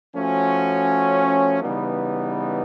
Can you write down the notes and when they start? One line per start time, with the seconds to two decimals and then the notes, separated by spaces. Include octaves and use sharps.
0.13 F3 A3 C#4 F#4
1.62 C#3 E3 G3 B3 D#4